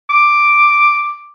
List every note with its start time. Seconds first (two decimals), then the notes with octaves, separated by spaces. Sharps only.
0.10 D6